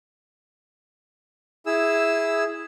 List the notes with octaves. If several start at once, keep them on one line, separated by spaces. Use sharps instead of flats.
E4 G#4 E6